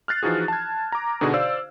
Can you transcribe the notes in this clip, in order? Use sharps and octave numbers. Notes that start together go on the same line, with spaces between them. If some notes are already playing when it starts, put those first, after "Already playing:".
F6 F#6 A6 C7
E3 F3 D#4 F#4 G#4
A5 G#6
A#5 D6
B2 D3 D4 D#4 F#4 G#4
C5 D5 F5 E6